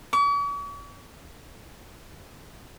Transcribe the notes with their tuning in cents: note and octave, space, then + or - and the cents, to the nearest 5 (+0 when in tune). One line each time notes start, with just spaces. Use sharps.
C#6 +45